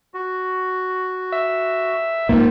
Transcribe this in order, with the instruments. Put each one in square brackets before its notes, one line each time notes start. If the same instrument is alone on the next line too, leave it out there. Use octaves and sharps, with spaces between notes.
[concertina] F#4
[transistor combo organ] E5
[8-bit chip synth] C#2 G#2 [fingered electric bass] A#3 [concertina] F4